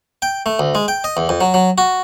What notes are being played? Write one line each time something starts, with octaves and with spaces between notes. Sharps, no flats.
G5
A3
D2
G#3
G5
D#5
E2
F2
F#3
F#3
F#4